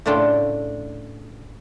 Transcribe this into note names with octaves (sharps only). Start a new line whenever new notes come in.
A2 C#3 A3 D4 F4 G5